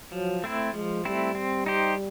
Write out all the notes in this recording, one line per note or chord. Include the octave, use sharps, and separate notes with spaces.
F3 F#3
A3 C4 E4
F3 G#3
G3 A3 C4 E4
C4
D#4 G4 C5